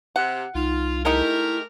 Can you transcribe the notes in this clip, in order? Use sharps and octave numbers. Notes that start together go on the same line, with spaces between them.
C3 F#5
C2 D#4 F4
G#3 A3 D#4 E4 G4 A#4